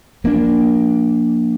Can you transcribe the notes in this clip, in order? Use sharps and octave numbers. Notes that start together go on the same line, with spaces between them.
F3 A#3 D4